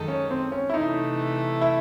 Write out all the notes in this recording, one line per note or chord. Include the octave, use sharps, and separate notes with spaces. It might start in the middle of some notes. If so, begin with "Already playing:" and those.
Already playing: F#2 D#3 G#3 D#4 A4
C#4
C4
C#4
E4
C3 E3 A3 D#4
E4